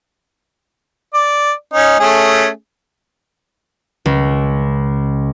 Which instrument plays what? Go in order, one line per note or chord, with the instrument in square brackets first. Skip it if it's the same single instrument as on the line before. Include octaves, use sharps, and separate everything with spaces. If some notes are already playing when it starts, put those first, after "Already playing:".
[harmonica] D5
C#4 D#4
A3 C#4 G#4
[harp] C#2